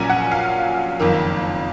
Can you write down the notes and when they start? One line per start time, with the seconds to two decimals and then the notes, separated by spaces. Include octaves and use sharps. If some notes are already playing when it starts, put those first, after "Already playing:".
Already playing: A#1 A#2 F#3 A#3 C#4 G#5 A#5
0.10 F#5
0.32 F5
0.99 F#1 F2 D#3 A#3